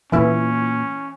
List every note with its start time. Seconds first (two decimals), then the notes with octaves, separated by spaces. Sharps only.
0.12 A#2 E3 A#3 C#4 E4